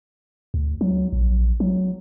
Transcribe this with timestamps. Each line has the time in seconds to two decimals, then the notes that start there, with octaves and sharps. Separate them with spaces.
0.54 D2
0.81 F#3
1.13 A#1
1.60 F#3